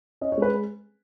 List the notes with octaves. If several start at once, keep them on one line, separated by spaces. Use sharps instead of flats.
C#4 D#5
C#5
G#3 B4